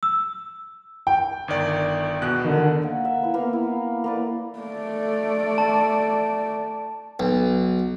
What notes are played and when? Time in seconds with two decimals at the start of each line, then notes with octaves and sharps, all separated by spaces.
0.03 E6
1.07 G5
1.48 G1 D#3 D5
2.22 E2 B2 F#6
2.44 D3 D#3
2.82 A#3 F#5
3.05 E5
3.22 E4 B4
3.34 A#3 B3 F5
3.53 E4
4.04 A#3 B4 D5
4.59 A3 D5
5.58 A5
7.20 B1